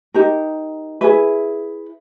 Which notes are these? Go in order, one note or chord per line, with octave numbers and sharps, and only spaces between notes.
D#4 G4 A#4
E4 G#4 B4 E5